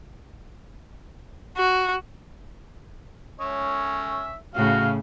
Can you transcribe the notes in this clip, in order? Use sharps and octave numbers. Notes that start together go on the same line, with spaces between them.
F#4
C#4 C#5 E5
A2 C#3 F#4 F5